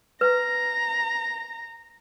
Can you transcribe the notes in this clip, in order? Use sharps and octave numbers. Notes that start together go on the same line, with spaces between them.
B4 A#5